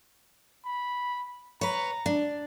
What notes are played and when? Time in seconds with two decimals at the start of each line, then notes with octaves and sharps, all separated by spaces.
0.65 B5
1.61 B4 C#5 A#5
2.06 D4